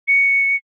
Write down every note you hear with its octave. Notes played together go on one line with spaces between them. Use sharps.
C#7